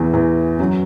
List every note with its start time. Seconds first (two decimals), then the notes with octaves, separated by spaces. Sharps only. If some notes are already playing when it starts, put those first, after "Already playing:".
Already playing: E2 E3
0.14 E2 E3
0.59 F#2 F#3